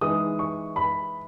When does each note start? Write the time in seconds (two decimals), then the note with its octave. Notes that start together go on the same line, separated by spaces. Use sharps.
0.01 E3 G#3 D#4 D#6
0.39 C#6
0.76 B5